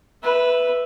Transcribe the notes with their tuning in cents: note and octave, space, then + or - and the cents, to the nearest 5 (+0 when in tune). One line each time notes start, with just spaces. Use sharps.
B4 +0 E5 +0